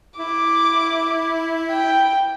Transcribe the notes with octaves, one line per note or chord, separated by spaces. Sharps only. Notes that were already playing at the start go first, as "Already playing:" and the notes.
E4 D6
G5